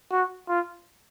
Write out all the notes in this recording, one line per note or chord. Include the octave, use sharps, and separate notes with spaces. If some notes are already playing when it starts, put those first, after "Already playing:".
F#4
F4